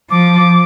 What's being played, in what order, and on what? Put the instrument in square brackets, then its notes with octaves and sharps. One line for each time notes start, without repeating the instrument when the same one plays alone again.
[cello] F3 [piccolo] D6